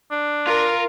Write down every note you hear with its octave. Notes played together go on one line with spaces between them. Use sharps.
D4
F4 A#4